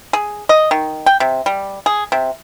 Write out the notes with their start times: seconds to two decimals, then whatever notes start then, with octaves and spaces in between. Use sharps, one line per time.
0.13 G#4
0.49 D#5
0.71 D#3
1.06 G5
1.20 C3
1.46 G3
1.86 G#4
2.12 C3